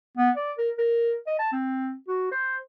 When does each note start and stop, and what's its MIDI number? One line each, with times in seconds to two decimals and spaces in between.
0.17 0.30 59
0.36 0.52 74
0.58 0.70 70
0.78 1.14 70
1.27 1.39 75
1.39 1.51 81
1.52 1.94 60
2.08 2.29 66
2.31 2.57 72